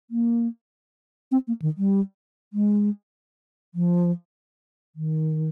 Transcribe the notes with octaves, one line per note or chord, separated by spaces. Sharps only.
A#3
C4
A#3
D#3
G3
G#3
F3
D#3